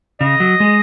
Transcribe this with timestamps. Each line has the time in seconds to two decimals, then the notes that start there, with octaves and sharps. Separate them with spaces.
0.20 C#3 D#5
0.40 F#3
0.60 G#3